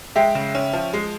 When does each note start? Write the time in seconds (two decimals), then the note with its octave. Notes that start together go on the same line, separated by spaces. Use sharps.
0.16 G#3 E5 G5
0.35 C#3
0.55 C#4
0.73 F3
0.93 G#3